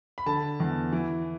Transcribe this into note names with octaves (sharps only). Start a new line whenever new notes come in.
B5
D3 A5
E2
E3